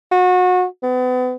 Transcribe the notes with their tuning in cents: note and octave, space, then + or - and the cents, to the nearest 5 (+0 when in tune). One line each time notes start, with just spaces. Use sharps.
F#4 -30
B3 +35